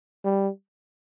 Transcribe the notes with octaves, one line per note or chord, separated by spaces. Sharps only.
G3